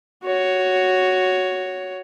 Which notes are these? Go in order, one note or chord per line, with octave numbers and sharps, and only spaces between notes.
F#4 C#5